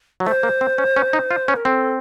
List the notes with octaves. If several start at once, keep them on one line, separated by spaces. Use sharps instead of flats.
F#3
A3 C5
A#3
C4
C#4
C#4
D#4
F4
C#4
A#4
C4 A4